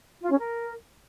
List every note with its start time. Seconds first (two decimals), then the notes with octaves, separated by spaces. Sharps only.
0.22 F4
0.30 C#4
0.39 A#4